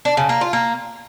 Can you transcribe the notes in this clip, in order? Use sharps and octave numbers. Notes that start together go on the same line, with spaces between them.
D4
C#3
A#3
F4
A#3